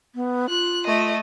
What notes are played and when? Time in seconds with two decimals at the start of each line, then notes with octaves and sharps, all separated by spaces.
0.15 B3
0.49 F4 F#6
0.86 A3 D#5